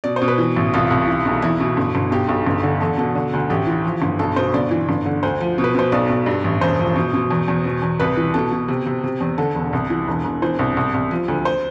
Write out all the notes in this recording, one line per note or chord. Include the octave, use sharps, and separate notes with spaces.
B2 D5
C5
B2
B4
E3
A1
C2 F4
C2
E3
B1
E2 E4
B2
G1
G1
B1 G4
B1
G1
D3
E2 A4
B2 A4
D3
D2
A1 G4
E3
F3
G1
B1 A4
B2 C5
G1 D5
E3
G1
D3
D2 C5
F3
B2
B4
B2 C5
B1 D5
B1
G2
A1
E1 C5
F3
B2
B2
E2
E2
B2
E2
C2 B4
E3
B2 A4
B2
C3
C3
C3
E2
D3 A4
E1
C2
E3
E1
E1
E3 C5
C2
C2
C2
F3
D2
C5